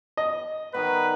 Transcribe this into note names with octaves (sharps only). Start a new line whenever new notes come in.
D#5
D#3 G3 B3 B4